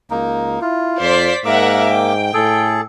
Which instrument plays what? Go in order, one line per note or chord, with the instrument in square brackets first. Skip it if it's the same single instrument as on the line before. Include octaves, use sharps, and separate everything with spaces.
[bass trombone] C#2 [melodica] A#3 D#4
[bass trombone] E4 [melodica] F4
[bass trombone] F2 [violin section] C5 D5 B6
[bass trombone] G#2 [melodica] A#3 D6 [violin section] A#4 E5 F#5
[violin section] G5
[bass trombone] A2 [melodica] G#4 A4